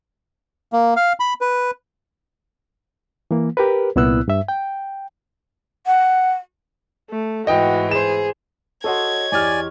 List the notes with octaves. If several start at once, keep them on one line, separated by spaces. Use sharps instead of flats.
A#3
F5
B5
B4
E3 A#3
G4 A#4 B4
C2 A#2 B3 E4 E6 F#6
G2 E5
G5
F#5
A3
G#2 E3 F#4 D#5 G5
G#4 C5 E7
F#4 A4 C#5 D#5 C6 G#6
E2 G4 D5 G#5 F6